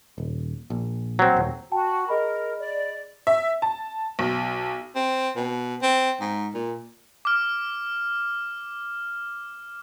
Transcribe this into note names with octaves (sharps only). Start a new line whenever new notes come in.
D#1
A#1
F#3 C4
D#1
F#4 G5 A5
G#4 A#4 D#5 B5
D5
E5
A5
B1
C4
B2
C4
G#2
A#2
D6 F6